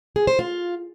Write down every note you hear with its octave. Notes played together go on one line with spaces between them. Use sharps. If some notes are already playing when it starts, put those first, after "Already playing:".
G#4
C5
F4